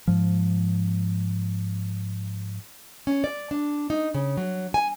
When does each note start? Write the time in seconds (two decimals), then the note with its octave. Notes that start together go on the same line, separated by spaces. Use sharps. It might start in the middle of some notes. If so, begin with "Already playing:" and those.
0.08 G#2 F3
3.07 C#4
3.24 D5
3.51 D4
3.90 D#4
4.14 C#3
4.37 F#3
4.74 G#5